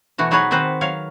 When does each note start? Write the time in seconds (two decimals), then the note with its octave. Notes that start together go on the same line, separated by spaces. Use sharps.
0.18 B2 E3 A3 F#4
0.31 F#3 D#4 F#4 G#4 B4 C#5
0.51 D#3 C4 F#4 B4 C5
0.81 F#3 C#5 F5